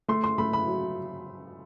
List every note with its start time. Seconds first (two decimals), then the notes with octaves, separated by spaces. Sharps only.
0.08 A3 C6
0.24 C6
0.38 A3 B5
0.53 B5
0.68 F#3